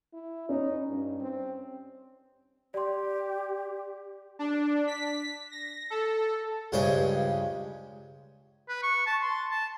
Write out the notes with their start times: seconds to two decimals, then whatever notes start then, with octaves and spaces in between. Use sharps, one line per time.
0.13 E4
0.49 C#4 D#4
0.89 G2
1.20 C4
2.74 G4 D5 C6
4.39 D4
4.87 B6
5.51 A#6
5.90 A4
6.72 C#2 G2 G#3 C#4 C5
8.69 B4
8.83 C#6
9.06 A5
9.22 C6
9.51 A5